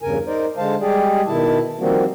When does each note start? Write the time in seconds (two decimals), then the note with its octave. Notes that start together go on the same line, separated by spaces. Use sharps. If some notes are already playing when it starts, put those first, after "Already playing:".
0.02 E2 G2 C#3 A#4 G#5
0.27 D#4 A#4 C5 D5
0.58 D3 G#3 C5 F5 A5
0.81 G3 G#3 G4 G#4 D5
1.27 B2 D#3 E4 A5
1.80 D#3 F3 G3 A#3 C4 F#4